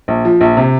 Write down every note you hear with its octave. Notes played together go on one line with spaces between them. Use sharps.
A#1
F3
A#1
C3